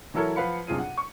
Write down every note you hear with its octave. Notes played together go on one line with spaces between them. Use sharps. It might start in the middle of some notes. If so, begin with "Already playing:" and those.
E3 F#3 E4 A4 A#4 C#5
F3 B4 F5 F#5 B5 C#7
B1 G2 C3 F4 G#4 D#7
F#5
C#6